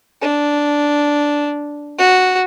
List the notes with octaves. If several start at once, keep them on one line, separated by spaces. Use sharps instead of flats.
D4
F#4